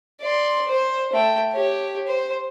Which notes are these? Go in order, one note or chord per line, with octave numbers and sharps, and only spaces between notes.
D5 C6
C5
A3 G5
G4 C#5
C5